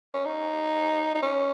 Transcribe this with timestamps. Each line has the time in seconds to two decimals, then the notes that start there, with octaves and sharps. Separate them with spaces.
0.14 C#4
0.25 D#4
1.15 D#4
1.22 C#4